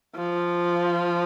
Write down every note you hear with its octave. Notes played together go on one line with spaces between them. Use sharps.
F3